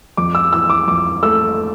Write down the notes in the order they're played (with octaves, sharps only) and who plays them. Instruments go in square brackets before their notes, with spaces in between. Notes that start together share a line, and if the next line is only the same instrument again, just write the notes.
[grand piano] F2 D6
E6
E3 E6
D6
F2 D6
A3 E6